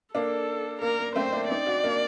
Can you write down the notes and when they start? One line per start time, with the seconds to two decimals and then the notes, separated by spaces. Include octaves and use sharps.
0.15 A#3 D4 A4
0.82 A#3 A#4
0.99 A#3
1.16 A3 C4 C5
1.33 A#3 D4
1.50 C4 D#4 D5
1.66 D4 F#4
1.84 A#3 D4